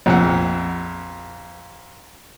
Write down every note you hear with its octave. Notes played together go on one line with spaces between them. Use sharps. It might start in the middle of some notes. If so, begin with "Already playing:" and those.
A#1 F2 F#5